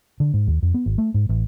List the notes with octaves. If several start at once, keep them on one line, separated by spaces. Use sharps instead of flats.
D3
G#2
D#2
F2
B3
G#1
A3
G#2
A1